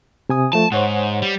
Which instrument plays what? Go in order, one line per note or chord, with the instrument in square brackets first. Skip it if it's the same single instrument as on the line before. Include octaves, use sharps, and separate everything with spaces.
[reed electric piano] C3 G#5 D#6
[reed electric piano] F3 A3 [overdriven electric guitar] A5
[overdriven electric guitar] G#2 [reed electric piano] C5 C#5 F#5
[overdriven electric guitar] G3